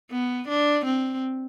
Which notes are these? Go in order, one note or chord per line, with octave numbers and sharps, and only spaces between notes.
B3
D4
C4